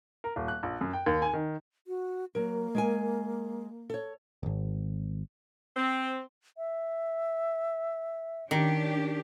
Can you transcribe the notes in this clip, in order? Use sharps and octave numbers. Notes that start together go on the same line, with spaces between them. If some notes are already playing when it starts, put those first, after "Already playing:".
A#4
D#1
F#6
A#1
F#2
G5
D#2
G#5
D#3
F#4
F#3 A#3 A#4
G#3 A#4 G#5
A4 C#5
D1 G#1
C4
E5
D#3 C#4 D4 G4